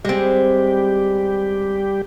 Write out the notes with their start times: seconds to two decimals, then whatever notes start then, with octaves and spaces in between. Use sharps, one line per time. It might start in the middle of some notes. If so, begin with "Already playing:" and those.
0.05 G3 G#3 C4 G4